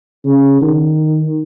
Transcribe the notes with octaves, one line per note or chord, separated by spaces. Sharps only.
C#3
D#3